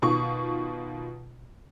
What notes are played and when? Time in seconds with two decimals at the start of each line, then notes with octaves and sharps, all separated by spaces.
0.02 B2 D#3 F4 C#6